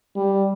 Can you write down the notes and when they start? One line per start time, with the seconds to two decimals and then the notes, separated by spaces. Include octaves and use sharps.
0.16 G3